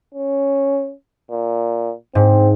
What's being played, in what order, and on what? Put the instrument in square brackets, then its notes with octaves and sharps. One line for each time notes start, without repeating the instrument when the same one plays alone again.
[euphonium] C#4
A#2
[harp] G#2 [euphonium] C4